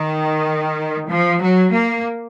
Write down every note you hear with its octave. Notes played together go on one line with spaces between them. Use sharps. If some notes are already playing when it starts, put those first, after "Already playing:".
Already playing: D#3
F3
F#3
A#3